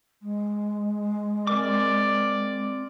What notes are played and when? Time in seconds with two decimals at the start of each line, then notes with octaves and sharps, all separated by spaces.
0.22 G#3
1.47 C4 A#4 D5 D6